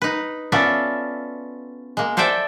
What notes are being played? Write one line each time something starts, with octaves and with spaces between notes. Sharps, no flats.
D#4 B4
B3 C#4 F4 A4 D5 E5
G#3 A#3
A4 C5 D5 E5 G5